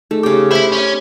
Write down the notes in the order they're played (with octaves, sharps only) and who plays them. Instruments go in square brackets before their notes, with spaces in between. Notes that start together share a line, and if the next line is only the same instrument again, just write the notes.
[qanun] A3 [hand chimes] D#4 G#4
[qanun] C#3 G5 [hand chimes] G4 D6
[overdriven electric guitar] E4 [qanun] C5 B5
[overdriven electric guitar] C#4